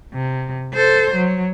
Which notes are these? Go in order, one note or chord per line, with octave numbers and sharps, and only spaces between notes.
C3
A4 C5
F#3